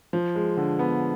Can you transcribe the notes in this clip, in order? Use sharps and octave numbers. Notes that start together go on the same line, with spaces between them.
F3
G#3
D3
B3